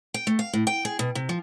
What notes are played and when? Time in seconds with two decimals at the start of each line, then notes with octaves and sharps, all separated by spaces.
0.14 G5
0.27 A3
0.39 F5
0.53 A2
0.67 G5
0.85 G#4
0.99 B2
1.15 C3
1.29 F3